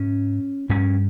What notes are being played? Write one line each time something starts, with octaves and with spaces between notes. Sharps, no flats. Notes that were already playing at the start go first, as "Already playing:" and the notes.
Already playing: G#2 C#4
G2 C#4